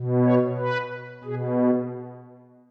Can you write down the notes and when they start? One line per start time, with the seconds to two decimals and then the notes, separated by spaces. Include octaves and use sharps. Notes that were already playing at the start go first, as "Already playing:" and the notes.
Already playing: B2
0.24 C#5
0.58 B4
1.24 B2 G#4